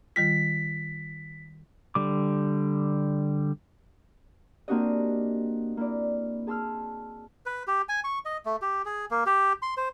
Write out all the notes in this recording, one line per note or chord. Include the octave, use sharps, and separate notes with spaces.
D#3 G3 F4 B6
D3 G3 D6
A#3 C4 D4 F#4 G4 D#5
A#3 E4 D5
G#4 A5 C6 E6 F6
B4
G4
G#5
C#6
D#5
A3
G4
G#4
A#3
G4
C6
C5